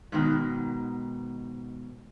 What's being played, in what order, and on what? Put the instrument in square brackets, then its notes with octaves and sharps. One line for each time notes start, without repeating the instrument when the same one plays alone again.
[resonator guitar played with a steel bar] G#2 B2 D#3